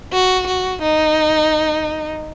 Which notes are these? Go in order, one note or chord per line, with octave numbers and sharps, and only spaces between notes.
F#4
F#4
D#4